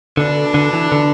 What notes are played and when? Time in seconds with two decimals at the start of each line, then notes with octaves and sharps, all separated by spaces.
0.17 B2 D3 A3 D4
0.54 D3
0.73 E3
0.92 D3